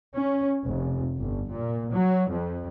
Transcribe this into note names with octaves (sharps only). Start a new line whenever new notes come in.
C#4
F1
G1
A#2
F#3
F2